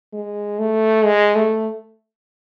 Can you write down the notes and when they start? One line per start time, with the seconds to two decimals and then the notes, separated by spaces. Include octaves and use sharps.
0.13 G#3
0.59 A3
1.05 G#3
1.35 A3